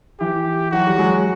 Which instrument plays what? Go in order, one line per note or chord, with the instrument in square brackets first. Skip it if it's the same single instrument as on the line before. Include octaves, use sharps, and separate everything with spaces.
[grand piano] E3 [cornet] G4
[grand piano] E3 F#3 [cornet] F#4
[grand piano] G3
F#3 G#3